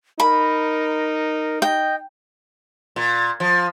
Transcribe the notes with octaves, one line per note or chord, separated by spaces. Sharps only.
D#4 A#4 B5
D#5 G5
A#2
F3